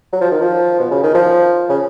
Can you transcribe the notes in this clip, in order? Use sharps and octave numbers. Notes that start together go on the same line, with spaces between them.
F#3
F3
D#3
F3
B2
C#3
D#3
F3
C#3